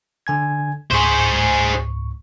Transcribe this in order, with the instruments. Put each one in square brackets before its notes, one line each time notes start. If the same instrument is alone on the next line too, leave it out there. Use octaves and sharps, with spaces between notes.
[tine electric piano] D3 G#5 G#6
[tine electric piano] C#2 G#2 C#6 [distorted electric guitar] G#4 C5